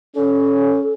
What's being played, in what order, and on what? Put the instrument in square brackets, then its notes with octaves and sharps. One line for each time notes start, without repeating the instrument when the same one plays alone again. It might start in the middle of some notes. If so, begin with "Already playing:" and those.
[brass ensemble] C#4 [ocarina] A4